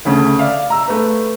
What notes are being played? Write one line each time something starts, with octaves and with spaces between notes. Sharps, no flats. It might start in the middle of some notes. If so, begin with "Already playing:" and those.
D2 C#3 A3
D5 E5 F5
A#5 E6
A3 B4